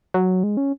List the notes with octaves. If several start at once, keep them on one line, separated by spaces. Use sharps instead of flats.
F#3
G#3
C#4